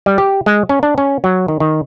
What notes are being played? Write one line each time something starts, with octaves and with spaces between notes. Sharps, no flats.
G3
G4
G#3
C#4
D4
C#4
F#3
D#3
D#3